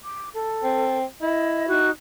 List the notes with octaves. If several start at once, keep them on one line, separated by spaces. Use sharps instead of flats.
D6
A4
C4
E4 D#5
D#4 F#4 F#6